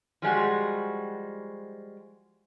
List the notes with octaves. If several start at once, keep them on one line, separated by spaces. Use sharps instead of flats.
F3 G3 G#3 F#4